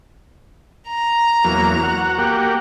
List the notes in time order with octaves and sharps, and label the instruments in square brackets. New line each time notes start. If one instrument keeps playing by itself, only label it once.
[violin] A#5
[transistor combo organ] E2 F#3 A#3
F#4 F#5
A#3 G4 F#5